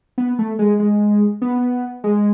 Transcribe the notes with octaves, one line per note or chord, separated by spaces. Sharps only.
B3
A3
G#3
G#3
B3
G#3